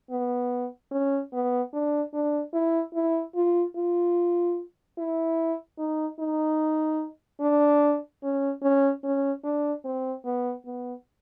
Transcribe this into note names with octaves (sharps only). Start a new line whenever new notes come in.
B3
C#4
B3
D4
D4
E4
E4
F4
F4
E4
D#4
D#4
D4
C#4
C#4
C#4
D4
C4
B3
B3